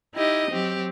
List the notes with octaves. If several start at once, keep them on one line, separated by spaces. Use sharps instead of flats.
D#4 E4 G4 D#5
F#3 C4 G4